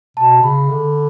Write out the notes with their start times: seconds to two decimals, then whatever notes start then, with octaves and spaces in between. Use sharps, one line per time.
0.17 B2 A5
0.43 C#3 B5
0.69 D3